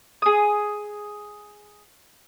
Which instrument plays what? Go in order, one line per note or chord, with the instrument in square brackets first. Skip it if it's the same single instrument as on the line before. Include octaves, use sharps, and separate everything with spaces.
[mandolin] G#4 D#6